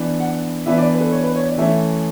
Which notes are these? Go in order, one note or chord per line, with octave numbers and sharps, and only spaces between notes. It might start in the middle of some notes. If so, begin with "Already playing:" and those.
Already playing: E3 B3 D4
F#5
E3 B3 D4 E5
D5
B4
A4
C#5
B4
C#5
D5
E3 A3 C#4 E5